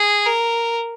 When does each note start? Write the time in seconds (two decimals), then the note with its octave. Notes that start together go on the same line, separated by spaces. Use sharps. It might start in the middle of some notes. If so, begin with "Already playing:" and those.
Already playing: G#4
0.26 A#4